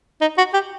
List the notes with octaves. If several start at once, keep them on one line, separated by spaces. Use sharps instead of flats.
D#4
F#4
G4